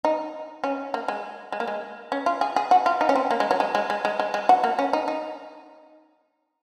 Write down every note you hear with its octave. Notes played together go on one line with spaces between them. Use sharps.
D#4
C#4
A#3
G#3
G#3
A#3
G#3
C#4
F4
G#4
G#4
F#4
F4
D#4
C#4
C4
A#3
G#3
F#3
G#3
G#3
G#3
G#3
G#3
G#3
F#4
A#3
C#4
D#4
D#4